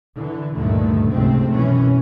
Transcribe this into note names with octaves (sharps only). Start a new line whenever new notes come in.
D3 E3
D2 G2 A#2 D3 D#3 A3
F1 C#2 G#2 C3 A3 C4
B1 F#2 E3 C#4